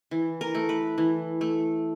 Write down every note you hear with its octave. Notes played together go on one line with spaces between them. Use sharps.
E3
A#4
A3
B4
E3
A3